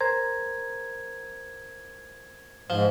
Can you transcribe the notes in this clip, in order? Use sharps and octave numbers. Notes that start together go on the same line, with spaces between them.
A#4 C5 A#5 G#6
G#2 F3